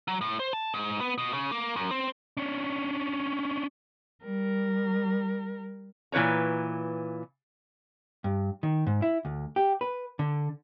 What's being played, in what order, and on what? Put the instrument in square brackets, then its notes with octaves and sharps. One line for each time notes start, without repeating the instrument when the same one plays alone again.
[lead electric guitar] F#3
A2
C5
A5
G#2
B3
B2
C#3
A#3
F#2
C4
C#4 D4
[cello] G3 A#4
[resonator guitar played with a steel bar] A#2 E3 B4 C#5 A#5
[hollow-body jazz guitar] G2
D#3
G#2
E4
D2
G4
B4
D3